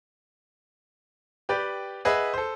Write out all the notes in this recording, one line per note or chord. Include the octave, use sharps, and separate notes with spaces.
G4 B4 D5 G5
G#4 B4 D#5 E5 F#5
A4 C5